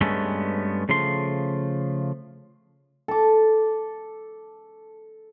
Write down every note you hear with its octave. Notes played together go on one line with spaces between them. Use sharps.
G2 G#3 A3 B3 C#4
C#3 F3 A3 C6
A4 D6